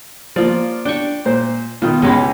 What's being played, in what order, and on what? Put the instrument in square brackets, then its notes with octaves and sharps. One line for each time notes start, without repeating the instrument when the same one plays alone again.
[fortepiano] F3 A#3 [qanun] F4 D5
[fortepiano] D4 [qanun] G5 C#6
[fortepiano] A#2 C5
[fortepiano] B2 D#3 [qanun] F4
[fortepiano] C#2 C#4 B5 [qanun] G#3 G4